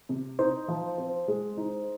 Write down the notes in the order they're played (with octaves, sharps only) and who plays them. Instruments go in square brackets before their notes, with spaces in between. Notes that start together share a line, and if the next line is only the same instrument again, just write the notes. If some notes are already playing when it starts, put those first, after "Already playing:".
[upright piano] C3
[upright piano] D#4 [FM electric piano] C5
[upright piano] F3
C4
G#3
D#4